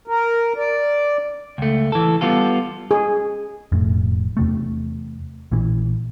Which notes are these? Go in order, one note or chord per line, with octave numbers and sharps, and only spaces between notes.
A#4
D5
C#2 A3
E3 A4
G3 B3 F4 A4
G#4
E1 F2 A2
E2 C3 A3
A#1 A#2 E3